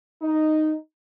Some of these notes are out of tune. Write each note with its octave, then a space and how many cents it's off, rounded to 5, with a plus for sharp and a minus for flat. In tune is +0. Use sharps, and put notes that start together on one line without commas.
D#4 -5